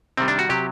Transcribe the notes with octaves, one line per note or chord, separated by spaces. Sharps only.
C3 D#3 G3 C4
D4
F#4
C3 F#3 G4